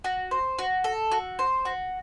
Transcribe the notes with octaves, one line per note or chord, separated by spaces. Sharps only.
F#4
C5
F#4
A4
F#4
C5
F#4